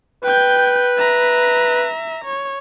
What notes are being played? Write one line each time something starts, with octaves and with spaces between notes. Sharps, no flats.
B4 G5 G6
E5 A#5
C#5